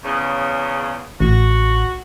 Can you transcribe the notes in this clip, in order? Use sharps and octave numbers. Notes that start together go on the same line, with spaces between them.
E2 C#3
A1 F#4